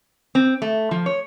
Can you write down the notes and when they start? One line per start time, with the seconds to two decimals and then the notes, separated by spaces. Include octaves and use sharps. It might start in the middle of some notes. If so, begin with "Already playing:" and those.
0.35 C4
0.62 A3
0.91 F3
1.06 C#5